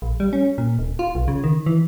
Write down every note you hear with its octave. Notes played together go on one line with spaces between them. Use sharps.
A#1
G3
C#4
A#2
D1
F4
B1
C#3
D#3
E3